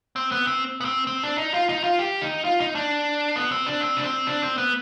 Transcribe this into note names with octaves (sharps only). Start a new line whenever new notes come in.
C4
B3
C4
B3
C4
C4
D4
D#4
F4
D#4
F4
G4
D#4
F4
D#4
D4
B3
C4
D4
C4
D4
C4
D4
C4
B3